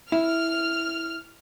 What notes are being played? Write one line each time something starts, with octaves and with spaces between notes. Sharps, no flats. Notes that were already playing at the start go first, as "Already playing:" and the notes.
E4 F6